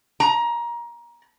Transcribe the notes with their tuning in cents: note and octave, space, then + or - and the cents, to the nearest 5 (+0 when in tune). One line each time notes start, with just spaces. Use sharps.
A#5 +20